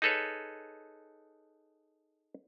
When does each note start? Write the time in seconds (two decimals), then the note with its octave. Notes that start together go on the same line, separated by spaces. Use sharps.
0.02 D#4 G#4 A4 B4 C#5